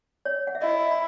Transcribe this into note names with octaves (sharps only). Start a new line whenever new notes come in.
C#5
F#5
E5
E4 D#5
B5